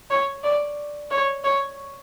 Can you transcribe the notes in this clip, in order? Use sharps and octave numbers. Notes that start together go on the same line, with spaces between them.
C#5
D5
C#5
C#5